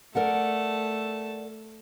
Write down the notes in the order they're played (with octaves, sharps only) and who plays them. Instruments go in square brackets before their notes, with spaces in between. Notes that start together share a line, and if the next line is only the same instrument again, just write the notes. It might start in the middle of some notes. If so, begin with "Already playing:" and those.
[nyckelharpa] A3 A5 [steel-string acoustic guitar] A#4 D5 F#5